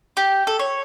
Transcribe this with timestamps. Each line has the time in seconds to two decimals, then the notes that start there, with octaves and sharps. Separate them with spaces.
0.17 G4
0.47 A4
0.59 C#5